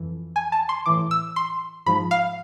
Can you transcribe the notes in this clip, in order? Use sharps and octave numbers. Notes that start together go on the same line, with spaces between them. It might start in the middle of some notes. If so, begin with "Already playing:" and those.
Already playing: F2 E3
G#5
A5
C6
A2 E3 D6
E6
C6
G#2 F3 B5
F5